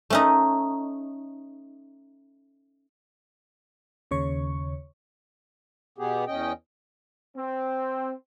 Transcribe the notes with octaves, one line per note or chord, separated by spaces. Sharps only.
A3 C#4 D#4
D#2 C#3 C#5 C#6
B2 B3 G4 G#4
E2 C#4 D#5 G5
C4